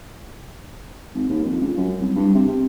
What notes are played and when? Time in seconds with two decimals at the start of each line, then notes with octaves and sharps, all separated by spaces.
1.15 G#1
1.29 D#2
1.45 F2
1.61 C#2
1.77 F#2
2.00 C2
2.15 G2
2.34 C3
2.48 C3